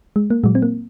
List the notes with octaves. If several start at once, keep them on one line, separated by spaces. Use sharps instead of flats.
G#3
A#3
A#2 F#3 G#3
C4
A#3